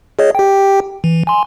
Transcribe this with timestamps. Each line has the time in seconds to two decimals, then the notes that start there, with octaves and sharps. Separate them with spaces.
0.19 G#4 C#5 D#5
0.35 G4 G5
1.04 E3
1.27 G#5 C6